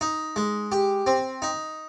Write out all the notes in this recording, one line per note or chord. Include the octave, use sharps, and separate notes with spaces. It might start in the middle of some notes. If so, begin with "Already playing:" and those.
D#4
G#3
G4
C4
D#4